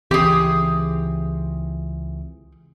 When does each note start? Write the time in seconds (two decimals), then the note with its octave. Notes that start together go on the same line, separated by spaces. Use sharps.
0.11 C#2 E3 C4 G4 G#4